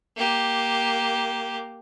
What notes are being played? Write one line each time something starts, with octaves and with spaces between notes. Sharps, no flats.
A#3 G4